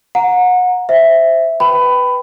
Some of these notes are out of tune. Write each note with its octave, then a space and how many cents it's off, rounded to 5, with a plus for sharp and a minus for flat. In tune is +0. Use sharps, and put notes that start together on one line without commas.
F#5 -30 A#5 +0
C5 +0 E5 +0
B4 +0 G5 +0 B5 +20